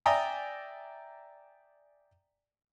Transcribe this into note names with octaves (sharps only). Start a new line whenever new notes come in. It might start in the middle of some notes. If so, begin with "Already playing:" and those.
D5 E5 G5 G#5 A#5 D#6